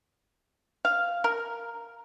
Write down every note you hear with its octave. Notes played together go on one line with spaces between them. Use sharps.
F5
A#4